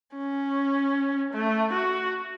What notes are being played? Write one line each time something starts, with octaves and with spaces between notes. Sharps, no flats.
C#4
A3
F#4